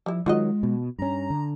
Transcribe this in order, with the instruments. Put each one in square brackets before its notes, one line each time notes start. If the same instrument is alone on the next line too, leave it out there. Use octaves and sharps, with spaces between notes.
[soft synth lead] F3 [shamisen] G3 E4
[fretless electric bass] D#3 F#3 [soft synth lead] G#3 [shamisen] F4 F#4 D#5
[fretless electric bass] B2
[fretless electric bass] G2 C#4 [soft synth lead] A#5
[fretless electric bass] D3